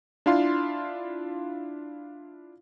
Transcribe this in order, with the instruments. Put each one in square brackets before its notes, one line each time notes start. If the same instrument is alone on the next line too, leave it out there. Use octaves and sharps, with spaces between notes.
[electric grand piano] D4 E4 F4 F5 C6